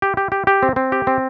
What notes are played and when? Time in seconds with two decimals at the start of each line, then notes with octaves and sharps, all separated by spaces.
0.02 G4
0.17 G4
0.32 G4
0.47 G4
0.63 C4
0.76 C4
0.92 G4
1.07 C4